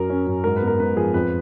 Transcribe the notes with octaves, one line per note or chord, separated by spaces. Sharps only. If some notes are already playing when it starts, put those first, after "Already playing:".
Already playing: F#2 F#3 A#4
C#4
F#2
G#2 A#4
B4
B3
A#4
G#2 B4
F3 G#4
F2 B4